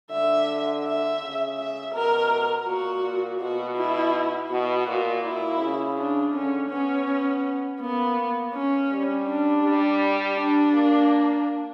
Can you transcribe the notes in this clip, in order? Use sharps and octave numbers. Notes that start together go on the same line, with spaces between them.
D3 E5
E5
C#3
E5
B2 A#4
A#2 F#4
A#2
B2 F#4
E4
B2 F#4
A#2
A#2 E4
C#3
D4
D3 C#4
B3 C#4
A#3 B3
C#4
G3
D4
G3
D4
A#3